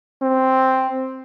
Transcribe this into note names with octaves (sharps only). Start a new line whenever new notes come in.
C4